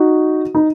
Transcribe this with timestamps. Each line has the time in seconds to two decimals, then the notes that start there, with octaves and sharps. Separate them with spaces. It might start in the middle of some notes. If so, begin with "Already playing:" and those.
Already playing: D#4 F#4
0.55 D#4